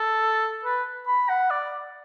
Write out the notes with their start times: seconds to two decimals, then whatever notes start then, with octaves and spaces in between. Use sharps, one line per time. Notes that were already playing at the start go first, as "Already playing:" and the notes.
Already playing: A4
0.65 B4
1.08 B5
1.29 F#5
1.51 D5